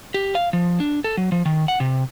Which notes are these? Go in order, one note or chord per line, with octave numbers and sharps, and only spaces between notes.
G4
F5
F3
D4
A4
F#3
F3
D#3
F#5
C3